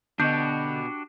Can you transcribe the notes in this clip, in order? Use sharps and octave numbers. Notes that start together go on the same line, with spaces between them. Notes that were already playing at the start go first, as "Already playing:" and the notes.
B2 D3 D4 F#4 G4 D#5 G6